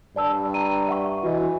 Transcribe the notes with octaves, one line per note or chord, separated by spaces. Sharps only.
G2 D5 A5 E6
A#5 D#7
E5 F#5 C#6
E3 F#4 D#5